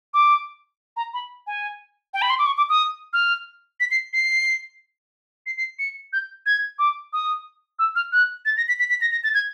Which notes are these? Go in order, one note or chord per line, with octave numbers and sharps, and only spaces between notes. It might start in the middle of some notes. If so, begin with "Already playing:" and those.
D6
A#5
B5
G#5
G5
B5
C6
D6
C#6
D6
D#6
F6
B6
C7
C7
C7
C7
C#7
G6
G#6
D6
D#6
E6
F6
F#6
A6
A#6
B6
B6
B6
A#6
A#6
A6
G#6